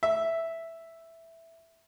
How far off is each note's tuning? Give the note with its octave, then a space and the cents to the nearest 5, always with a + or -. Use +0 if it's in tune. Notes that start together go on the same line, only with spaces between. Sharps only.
E5 +0